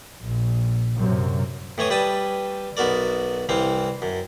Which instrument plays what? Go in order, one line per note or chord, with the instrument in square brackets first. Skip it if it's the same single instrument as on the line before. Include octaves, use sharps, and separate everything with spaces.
[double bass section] A#1
F#2 C3
[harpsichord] A2 E3 C#5 D#6
G3 B4 G5 A5 D#6
B1 B3 F#4 A#4 D5
C2 E3 C4 F5
F#2